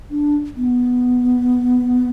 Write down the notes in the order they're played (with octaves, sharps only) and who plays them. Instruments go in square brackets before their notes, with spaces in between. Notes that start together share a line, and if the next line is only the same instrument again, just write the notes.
[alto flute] D4
B3